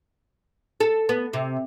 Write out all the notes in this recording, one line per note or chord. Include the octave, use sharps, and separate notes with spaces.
A4
B3
C3